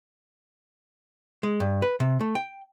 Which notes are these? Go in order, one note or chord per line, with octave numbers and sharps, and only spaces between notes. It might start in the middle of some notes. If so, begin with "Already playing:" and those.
G#3
G2
B4
C3
A3
G5